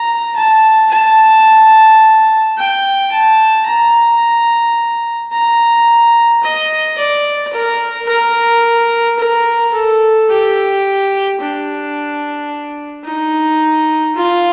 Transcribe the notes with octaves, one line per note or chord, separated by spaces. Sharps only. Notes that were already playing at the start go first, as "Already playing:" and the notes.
Already playing: A#5
A5
A5
G5
A5
A#5
A#5
D#5
D5
A#4
A#4
A#4
A4
G4
D4
D#4
F4